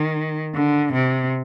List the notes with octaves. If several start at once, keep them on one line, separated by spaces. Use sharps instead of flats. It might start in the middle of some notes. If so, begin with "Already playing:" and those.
Already playing: D#3
D3
C3